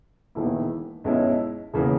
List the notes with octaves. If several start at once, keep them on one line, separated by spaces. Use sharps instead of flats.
E1 E2 D#3 A#3 E4
B1 B2 G#3 C#4 E4
E1 C#3 E3 A#3